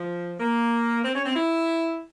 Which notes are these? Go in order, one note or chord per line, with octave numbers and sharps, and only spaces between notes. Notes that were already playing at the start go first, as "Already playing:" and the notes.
Already playing: F3
A#3
C4
C#4
C4
E4